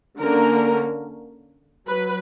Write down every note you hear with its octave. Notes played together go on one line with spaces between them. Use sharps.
D3 A#3 C#4 A#4
F#3 B4